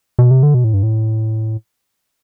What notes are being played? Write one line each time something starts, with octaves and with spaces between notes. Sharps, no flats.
B2
C3
D3
B2
A2
G2
A2